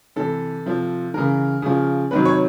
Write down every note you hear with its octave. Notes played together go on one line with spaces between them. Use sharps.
C3 E3 A4
C3 F3
C#3 E3 A#4
C#3 F3
C3 D#3 F#3 B4
C#5